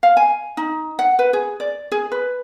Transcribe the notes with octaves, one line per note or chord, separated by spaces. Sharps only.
F5
G#5
D#4
F#5
B4
G#4
D5
G#4
B4